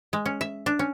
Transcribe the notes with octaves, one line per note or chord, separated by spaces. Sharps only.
G#3
C#4
E5
D4
C#4